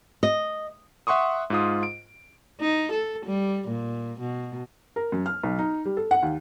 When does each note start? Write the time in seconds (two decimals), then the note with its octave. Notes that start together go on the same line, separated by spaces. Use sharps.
0.23 D#5
1.07 E5 F#5 C6 C#6 D#6
1.50 G#2 F4 D#6
1.83 D7
2.61 D#4
2.92 A4
3.26 G3
3.68 A#2
4.20 B2
4.96 A#4
5.12 F#2
5.26 F6
5.44 B1
5.59 D#4
5.85 G3
5.97 A4
6.11 F#5
6.23 D#2